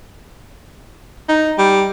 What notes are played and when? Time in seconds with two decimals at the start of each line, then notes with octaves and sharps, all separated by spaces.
1.29 D#4
1.58 G3